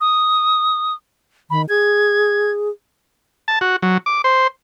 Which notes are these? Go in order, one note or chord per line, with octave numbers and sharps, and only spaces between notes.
D#6
D#3 B5
G#4 G#6
A5
F#4
F#3
D6
C5